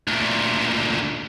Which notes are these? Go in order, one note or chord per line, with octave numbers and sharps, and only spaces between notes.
D2 A#2